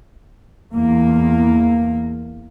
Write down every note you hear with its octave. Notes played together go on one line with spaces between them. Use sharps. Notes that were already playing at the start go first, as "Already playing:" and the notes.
E2 A#3